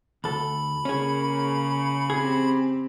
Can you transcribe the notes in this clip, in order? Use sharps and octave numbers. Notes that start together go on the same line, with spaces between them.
D2 A4 B5
C#3 A#3 C#4 G#4
C4 G4 G#4